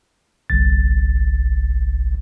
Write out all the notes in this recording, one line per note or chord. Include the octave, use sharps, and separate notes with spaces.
G1 C2 A6